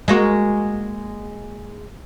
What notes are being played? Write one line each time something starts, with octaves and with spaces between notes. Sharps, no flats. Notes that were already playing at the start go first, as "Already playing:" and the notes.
G#3 A#3 F#4